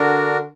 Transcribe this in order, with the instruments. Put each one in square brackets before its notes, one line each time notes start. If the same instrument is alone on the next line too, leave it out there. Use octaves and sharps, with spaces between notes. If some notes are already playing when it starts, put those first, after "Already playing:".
Already playing: [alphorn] D3 [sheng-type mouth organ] D4 F#4 A#4